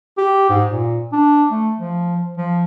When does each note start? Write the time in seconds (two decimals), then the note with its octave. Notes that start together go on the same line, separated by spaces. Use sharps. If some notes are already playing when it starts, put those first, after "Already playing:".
0.18 G4
0.50 G#2
0.70 A#2
1.12 D4
1.51 A3
1.79 F3
2.38 F3